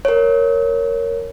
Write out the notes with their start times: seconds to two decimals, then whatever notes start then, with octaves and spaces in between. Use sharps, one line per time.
0.05 A#4 C#5